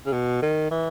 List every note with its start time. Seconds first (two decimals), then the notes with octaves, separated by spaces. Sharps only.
0.06 C#3
0.13 B2
0.42 D#3
0.71 E3